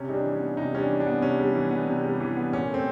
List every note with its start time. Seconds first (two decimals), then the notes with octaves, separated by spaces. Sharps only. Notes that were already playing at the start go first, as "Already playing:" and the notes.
Already playing: C3 C#4
0.09 G3 D#4
0.14 D4
0.24 E3
0.35 C#4
0.40 B3
0.57 C3 D#4
0.73 G3 C#4
0.78 D4
0.89 E3
1.00 D4
1.06 B3
1.22 C3 C#4
1.39 G3
1.55 E3
1.71 B3
1.88 C3
2.04 G3
2.20 E3
2.37 B3
2.53 A#2 C#4
2.70 A3 C4